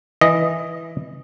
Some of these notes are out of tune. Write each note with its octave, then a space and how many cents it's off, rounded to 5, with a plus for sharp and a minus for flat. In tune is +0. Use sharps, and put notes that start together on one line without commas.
E3 +0 D#5 +0